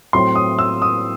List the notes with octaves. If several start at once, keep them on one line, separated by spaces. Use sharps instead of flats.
A2 F#3 C4 E4 C6
D#6
E6
D#6